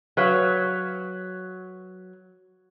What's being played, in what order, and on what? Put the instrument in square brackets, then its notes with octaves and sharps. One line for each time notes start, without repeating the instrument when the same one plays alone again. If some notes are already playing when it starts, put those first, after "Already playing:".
[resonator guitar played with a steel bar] F#3 B4 C#5 F5